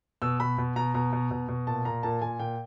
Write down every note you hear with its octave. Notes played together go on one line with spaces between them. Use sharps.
B2 E6
B2 B5
B2
B2 A#5
B2 A#5
B2
B2
B2
A#2 A5
A#2 A#5
A#2 A5
A#2 G#5
A#2 G5